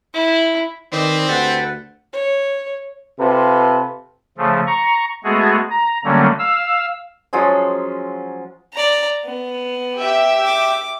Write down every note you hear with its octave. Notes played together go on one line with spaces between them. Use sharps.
E4
D#3 C4 B4 C5 D5 D#5
D2 G4 A4 B4 F#5
C#5
C3 F4 A4 B4 C5
C#3 F3 A3
A#5 C#6
G#3 A3 B3 F#4 G#4
A#5
D3 F#3 G3 A3 A#3 C#4
F5 E6
F3 F#3 G#3 C#4
D5 A#5
B3
G4 E5
D6